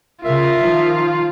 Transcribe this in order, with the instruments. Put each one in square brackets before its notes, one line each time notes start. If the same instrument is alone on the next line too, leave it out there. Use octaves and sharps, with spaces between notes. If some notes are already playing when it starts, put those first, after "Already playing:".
[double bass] C#3 [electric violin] F4 [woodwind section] A#4 E5
[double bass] D#3 F3